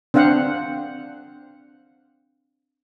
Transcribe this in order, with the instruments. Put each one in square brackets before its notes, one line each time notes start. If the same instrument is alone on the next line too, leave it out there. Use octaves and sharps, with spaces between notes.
[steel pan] C4 D4 C5 F5 F#5